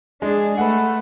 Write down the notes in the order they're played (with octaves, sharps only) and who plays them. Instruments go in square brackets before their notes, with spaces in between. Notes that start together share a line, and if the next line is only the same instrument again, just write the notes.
[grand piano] G#3 [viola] D4 G#4
[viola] A3 [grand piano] B4 F#5